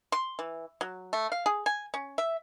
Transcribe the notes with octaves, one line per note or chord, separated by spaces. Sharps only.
C6
E3
F#3
A3
F5
G#4
G#5
C#4
E5